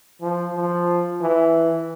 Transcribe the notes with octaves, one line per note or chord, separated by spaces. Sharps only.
F3
F3
E3